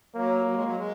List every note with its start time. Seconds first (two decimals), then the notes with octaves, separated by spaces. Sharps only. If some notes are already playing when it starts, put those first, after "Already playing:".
0.15 F#3 A#3
0.46 F#3
0.55 G#3
0.64 F#3
0.77 G#3